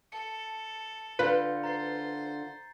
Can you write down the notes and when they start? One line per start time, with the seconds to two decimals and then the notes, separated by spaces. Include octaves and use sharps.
0.12 A4 C#7
1.19 D3 F4 B4 G6
1.63 C5 A#5 A6 C7